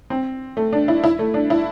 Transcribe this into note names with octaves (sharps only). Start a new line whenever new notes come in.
C4
A3
D4
E4
E4
A3
D4
E4